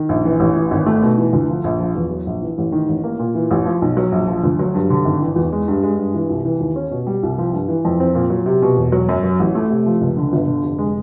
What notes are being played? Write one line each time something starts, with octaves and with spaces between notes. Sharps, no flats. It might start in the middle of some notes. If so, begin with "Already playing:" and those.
Already playing: D#3
A#1
E3
A1
E3
G#1
A3
B2
E3
D2
F3
A#1
F3
E2
F#3
A#1
E3
A1
D#3
A1
A#3
A#2
E3
A1
F3
B1
F#3
A#1
F3
D2
F#3
G2
D3
G#1
E3
E2
G#3
G2
G#3
G2
E3
C2
E3
D#2
C#4
B2
G3
C2
F3
G2
E3
F2
C4
A#2
F#3
C3
B2
E1
F#3
F#2
F#3
A1
A3
C3
F3
C#2
D3
G1
D3
F1
G#3